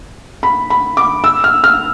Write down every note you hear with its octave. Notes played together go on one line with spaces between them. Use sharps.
B5
B5
D6
E6
F6
F6